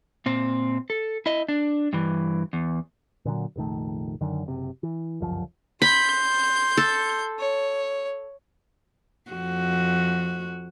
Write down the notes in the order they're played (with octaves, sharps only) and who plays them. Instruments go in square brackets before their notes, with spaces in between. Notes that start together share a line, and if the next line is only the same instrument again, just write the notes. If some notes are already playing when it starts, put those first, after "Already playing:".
[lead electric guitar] A#2 C4
A4
E4 D#5
D4
G2 E3
E2
[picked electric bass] A#2 D3 D#3 F#3
F1 A#1 D#3 A3
F#2 D3 D#3
F#1 C3
E3
G1 C#2 F#2 F3
[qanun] B5 [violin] C6 G6
[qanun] A4
[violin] C#5
[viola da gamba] F2 F#4